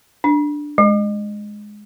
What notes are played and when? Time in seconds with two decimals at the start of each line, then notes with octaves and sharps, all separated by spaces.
0.24 D4
0.78 G#3